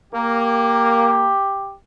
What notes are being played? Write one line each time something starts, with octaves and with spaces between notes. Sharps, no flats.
A#3 G4